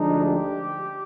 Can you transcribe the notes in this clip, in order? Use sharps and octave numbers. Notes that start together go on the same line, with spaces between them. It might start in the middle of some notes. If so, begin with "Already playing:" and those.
Already playing: D2 D3 F3 G#3 D4 D#4
G4